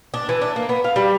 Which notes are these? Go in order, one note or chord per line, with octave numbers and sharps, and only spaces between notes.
D4
E3
D4
A#3
B3
F5
G3